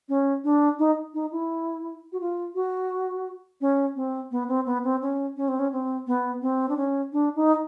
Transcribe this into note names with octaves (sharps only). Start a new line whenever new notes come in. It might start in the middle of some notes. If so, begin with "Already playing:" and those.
C#4
D4
D#4
D#4
E4
F#4
F4
F#4
C#4
C4
B3
C4
B3
C4
C#4
C#4
C4
C#4
C4
B3
C4
D4
C#4
D4
D#4